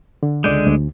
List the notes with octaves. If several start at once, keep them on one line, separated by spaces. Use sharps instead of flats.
D3
C#2 D3 G#3 D5 G6
D2